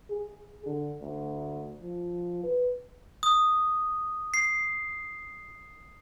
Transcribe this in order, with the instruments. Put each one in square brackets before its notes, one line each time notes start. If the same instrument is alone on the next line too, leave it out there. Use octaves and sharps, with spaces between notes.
[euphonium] G#4
D3
D2
F3
B4
[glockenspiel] D#6
C7